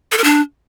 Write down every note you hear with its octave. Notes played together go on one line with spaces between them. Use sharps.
A4
A#4
D4